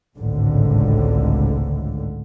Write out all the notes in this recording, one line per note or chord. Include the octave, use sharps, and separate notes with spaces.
G#1 C#2 A2 D3